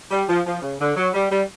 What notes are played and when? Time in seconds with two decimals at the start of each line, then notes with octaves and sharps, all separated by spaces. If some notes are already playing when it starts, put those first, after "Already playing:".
0.11 G3
0.28 F3
0.46 F3
0.62 C#3
0.80 D3
0.96 F#3
1.14 G3
1.31 G3